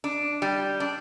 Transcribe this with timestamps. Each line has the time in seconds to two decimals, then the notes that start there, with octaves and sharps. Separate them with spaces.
0.04 D4
0.42 G3
0.80 D4